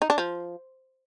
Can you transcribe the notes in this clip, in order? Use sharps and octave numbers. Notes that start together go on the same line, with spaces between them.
D#4
D4
F3